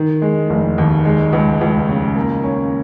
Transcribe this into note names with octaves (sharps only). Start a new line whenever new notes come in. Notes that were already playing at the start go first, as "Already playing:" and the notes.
Already playing: D#3
G#3
F1
D#2
G#3
C#2
C#2
C#3
A#3
C#4